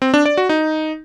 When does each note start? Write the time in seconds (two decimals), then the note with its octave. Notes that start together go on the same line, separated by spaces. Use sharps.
0.02 C4
0.14 D4
0.26 D5
0.37 F#4
0.49 D#4